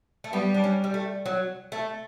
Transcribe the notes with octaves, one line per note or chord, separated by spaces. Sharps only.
A3
G3 B3
D4
C#4
G3
A3
F#3
A3